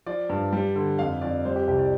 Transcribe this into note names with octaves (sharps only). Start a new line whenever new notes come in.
F3 D5
G2
G3
D3
F2 F5
F2 D5
G3 C5
G4
C2 G4
D5